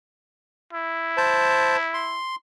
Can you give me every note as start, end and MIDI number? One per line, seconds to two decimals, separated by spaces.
0.73 2.20 64
1.17 1.77 72
1.17 1.77 81
1.94 2.36 84